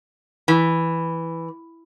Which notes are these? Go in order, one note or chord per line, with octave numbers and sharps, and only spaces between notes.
E3